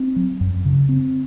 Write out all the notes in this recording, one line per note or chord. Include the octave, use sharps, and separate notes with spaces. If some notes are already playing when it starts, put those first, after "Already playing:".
Already playing: C4
F#3
F#2
C#3
C4